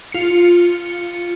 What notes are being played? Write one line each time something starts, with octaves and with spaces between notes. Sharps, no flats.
F4 C#7